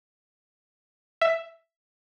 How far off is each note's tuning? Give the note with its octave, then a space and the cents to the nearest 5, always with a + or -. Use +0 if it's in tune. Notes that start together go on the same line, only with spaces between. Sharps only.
E5 +5